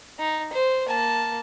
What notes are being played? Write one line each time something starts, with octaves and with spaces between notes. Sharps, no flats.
D#4
C5
A#3 A5